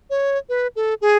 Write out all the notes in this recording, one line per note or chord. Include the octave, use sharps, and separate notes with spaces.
C#5
B4
A4
G#4